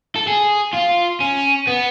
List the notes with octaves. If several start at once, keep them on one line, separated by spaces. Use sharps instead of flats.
A4
G#4
F4
C#4
B3